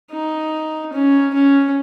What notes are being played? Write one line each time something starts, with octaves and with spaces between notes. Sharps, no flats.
D#4
C#4
C#4